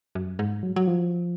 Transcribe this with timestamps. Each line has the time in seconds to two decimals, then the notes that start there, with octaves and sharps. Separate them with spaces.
0.15 F#2
0.39 G#2
0.63 F#3
0.76 F#3
0.87 F3